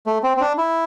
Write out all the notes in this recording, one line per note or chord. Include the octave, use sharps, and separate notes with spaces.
A3
C4
C4
D4
E4